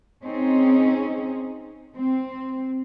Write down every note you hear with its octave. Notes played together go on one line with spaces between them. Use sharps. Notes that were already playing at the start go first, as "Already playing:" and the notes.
C4 C#4 D#4 G#4
C4